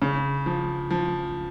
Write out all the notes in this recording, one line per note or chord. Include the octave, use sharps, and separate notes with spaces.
C#3
F3
F3